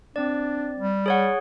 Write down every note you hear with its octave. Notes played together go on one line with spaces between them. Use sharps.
C4 D4 D5
G3
G#4 C#5 F#5